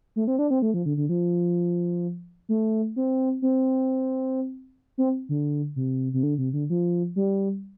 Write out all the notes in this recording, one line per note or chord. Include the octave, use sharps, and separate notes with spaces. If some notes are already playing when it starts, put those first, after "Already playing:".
A3
C4
D4
C4
A3
F3
D3
D3
F3
A3
C4
C4
C4
D3
C3
C3
D3
C3
D3
F3
G3